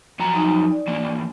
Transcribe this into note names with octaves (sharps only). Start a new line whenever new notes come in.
F2 F#3 A#5
D#4
D5
E3 A#3 D4